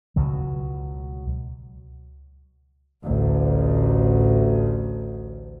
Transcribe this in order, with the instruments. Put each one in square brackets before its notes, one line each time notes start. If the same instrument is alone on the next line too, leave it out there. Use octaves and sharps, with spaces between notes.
[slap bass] C#2 B2 F#3
[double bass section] A1 D2